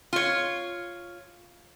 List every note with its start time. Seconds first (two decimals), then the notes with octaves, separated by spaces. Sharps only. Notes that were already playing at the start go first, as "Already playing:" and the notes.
0.13 F4 C#5